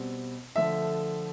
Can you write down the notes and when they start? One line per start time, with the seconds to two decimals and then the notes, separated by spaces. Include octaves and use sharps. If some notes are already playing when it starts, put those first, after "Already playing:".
Already playing: B2 G3 C4
0.56 D3 F3 A3 E5